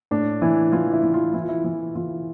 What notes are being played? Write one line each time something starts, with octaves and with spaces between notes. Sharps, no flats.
A2 D4
E3 E4
E3 F4
E4
E3
F4
E3 E4
F4
E4
E3 E4
E3 F4